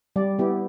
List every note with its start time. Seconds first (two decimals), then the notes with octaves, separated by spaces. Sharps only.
0.16 G3 D5
0.39 B3 E4 G4